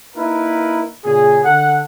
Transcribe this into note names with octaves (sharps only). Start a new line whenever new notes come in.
A#3 D#4 E4 A#4 B4
A#2 C#3 G#4
D3 A4 F#5